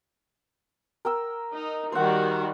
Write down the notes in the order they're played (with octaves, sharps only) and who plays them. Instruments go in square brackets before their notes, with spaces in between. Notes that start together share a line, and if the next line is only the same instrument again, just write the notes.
[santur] A#4 G5 E6
[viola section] D#4
[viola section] D#3 G3 F#4 [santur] C5 F#5